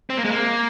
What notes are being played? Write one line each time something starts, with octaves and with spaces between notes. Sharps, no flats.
C4
A#3
G#3
A#3